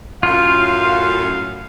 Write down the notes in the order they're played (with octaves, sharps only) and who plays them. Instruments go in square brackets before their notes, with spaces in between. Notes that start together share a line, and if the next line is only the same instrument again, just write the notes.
[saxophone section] F#2 A2 [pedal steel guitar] F4 [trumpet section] F5